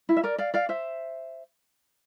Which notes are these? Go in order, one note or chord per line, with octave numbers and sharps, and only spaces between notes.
E4
E5
A#4 D5
D5 F5
D5 F5
C5 E5